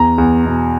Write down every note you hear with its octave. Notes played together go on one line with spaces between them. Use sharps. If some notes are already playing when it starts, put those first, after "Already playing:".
Already playing: E2 A#5
E2
B2